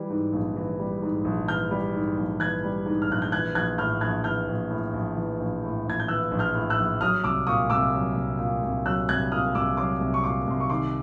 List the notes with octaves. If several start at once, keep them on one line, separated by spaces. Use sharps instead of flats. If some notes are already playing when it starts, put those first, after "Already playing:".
Already playing: E3 G3
G#2
A#1
E3
G3
G#2
A#1
E3 F6 G6
G3
G#2
A#1
E3 F#6 G#6
G3
G#2
F6
A#1 F#6
G6
E3 F#6 G#6
A#1 F#6 G#6
A2 F6 G6
A#1 F#6 G#6
E3 F6 G6
A#1
A2
A#1
E3
A#1
A2
A#1 G#6
G6
E3 E6 F#6
A#1
F6 G6
A2
E6 F#6
A#1
F#3 D#6 F6
C2 D6 E6
A#2 C#6 D#6
C2 D6 E6
F#3
C2
A#2
C2
F#3 E6 F#6
C2 F#6 G#6
A#2 D#6 F6
C2 D6 E6
F#3 C6 D6
C2
C#6
A#2 C6 D6
C2 C6
C#6
D#3 C6 D6